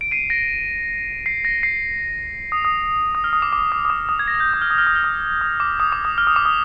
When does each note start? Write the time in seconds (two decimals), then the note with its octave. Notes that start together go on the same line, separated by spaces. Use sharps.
0.01 D7
0.11 C7 D#7
0.30 A#6 D7
1.26 C7
1.45 A#6
1.63 C7
2.52 D#6
2.65 D#6
3.15 D#6
3.24 F6
3.33 D#6
3.42 D6
3.53 D6
3.72 D#6
3.85 D#6
3.90 D6
4.09 D#6
4.19 G#6
4.28 A#6
4.40 G6
4.54 D#6
4.62 F6
4.70 D#6
4.78 F6
4.87 D#6
4.96 F6
5.04 D#6
5.41 D#6
5.60 D6
5.80 D#6
5.92 D6
6.05 D#6
6.18 F6
6.27 D#6
6.36 D6
6.45 D#6